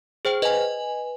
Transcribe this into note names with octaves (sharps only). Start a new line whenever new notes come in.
G#4 C5 G5
B4 D#5 G#5